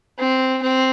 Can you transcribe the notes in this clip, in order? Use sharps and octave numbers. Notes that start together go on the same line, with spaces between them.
C4
C4